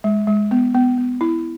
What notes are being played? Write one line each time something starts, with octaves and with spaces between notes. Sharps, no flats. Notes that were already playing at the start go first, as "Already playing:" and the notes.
G#3
G#3
B3
B3
B3
E4